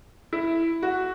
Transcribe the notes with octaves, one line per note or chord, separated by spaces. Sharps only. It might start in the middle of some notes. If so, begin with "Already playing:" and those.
E4
F#4